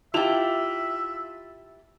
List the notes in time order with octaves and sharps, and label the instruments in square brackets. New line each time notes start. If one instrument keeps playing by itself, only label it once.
[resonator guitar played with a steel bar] E4 G4 [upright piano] F4 A5 F7 [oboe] E5